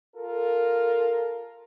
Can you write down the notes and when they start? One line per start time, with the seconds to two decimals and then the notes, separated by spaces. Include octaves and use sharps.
0.16 F4 A4 A#4